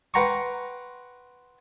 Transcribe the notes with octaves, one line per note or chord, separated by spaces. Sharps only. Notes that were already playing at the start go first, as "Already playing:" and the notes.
B4 F#5 G5 A#5 C6 C#6